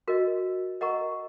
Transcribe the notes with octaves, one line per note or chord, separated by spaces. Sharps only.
F#4 A#4 D#5
A#4 D#5 F#5 A#5 C#6